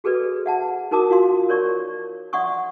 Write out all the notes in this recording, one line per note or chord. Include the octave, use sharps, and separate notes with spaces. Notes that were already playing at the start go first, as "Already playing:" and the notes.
F#4 G#4 A4 B4 D5
E5 F#5 A5
D#4 F#4 A#4 A5 D6 D#6
F4 F#4 F5 C6
A#4 C#5 D5 C#6
D5 E5 F#5 C6 C#6 D#6